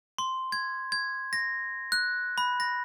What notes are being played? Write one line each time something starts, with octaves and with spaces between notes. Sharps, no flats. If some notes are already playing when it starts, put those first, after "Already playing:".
C6
G#6
G#6
A#6
F#6
B5
A#6